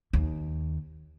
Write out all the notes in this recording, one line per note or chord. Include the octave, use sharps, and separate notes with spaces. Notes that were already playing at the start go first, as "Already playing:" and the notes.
D#2